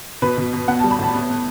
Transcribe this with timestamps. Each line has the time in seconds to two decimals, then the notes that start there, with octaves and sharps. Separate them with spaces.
0.22 B2 B4
0.38 B2
0.53 B2
0.68 B3 F#5
0.79 A5
0.84 G3
0.91 B5
0.99 A2 A5
1.14 B3
1.30 B3